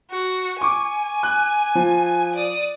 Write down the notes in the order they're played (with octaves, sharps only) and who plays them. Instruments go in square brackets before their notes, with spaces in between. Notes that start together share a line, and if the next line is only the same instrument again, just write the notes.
[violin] F#4
[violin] G#5 [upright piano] C#6 D6
[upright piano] F#6
F3
[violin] D5 D#6